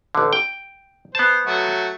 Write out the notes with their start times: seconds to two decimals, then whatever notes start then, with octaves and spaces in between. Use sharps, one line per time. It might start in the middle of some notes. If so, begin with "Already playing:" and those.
0.15 A1 D3
0.33 G5
1.15 B3 C5 A5
1.46 F#3 A3 F#4